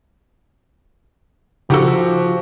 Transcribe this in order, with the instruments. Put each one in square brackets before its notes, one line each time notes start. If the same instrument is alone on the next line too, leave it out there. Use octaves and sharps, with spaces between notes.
[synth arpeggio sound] C#3 D#4 A4 [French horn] F3 [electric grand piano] F#4 G4